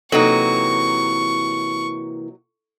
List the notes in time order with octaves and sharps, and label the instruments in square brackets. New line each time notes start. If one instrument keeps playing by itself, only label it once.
[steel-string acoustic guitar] C3 E3 A#3 [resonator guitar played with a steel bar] F#3 D#4 [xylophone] A4 [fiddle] C#6